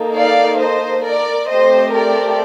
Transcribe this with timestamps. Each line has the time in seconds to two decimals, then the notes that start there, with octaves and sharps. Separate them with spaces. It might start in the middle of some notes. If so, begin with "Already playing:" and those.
Already playing: A#3 D#4 A4
0.15 D5 F5
0.60 C5 D#5
1.04 A#4 D5
1.49 A3 C4 G4 C5 D#5
1.94 A#4 D5